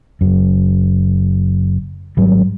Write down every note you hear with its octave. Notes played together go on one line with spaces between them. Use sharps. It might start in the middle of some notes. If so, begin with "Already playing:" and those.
F#1 F#2
G#1 G#2 F#3 G3